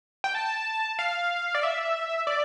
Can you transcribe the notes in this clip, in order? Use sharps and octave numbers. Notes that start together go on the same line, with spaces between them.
G5
A5
F5
D5
E5
D5